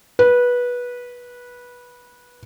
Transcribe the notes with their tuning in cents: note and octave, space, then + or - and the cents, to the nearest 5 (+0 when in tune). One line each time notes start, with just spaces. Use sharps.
B4 -15